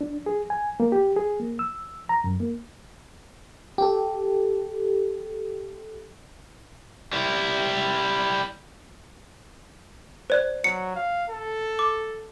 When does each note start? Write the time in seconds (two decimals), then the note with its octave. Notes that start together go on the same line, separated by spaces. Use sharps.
0.01 D4
0.26 G#4
0.50 G#5
0.80 A#3
0.92 G4
1.16 G#4
1.40 A#3
1.59 E6
2.09 A#5
2.24 F#2
2.40 A#3
3.78 G4 A4
7.13 G3 E4
10.30 C5 D5 F#6
10.64 F#3 C#7
10.96 F5
11.30 A4
11.79 D6